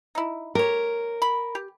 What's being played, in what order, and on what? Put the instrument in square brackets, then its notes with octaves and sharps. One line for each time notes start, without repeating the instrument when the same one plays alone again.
[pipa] D#4 E4
[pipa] G4 C#5 [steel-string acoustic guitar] A#4
[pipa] B5
G4